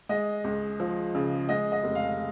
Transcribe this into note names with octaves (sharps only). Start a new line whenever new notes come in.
G#3 D#5
C#2
F3
C#3
G#3 D#5
D#5
F1
F5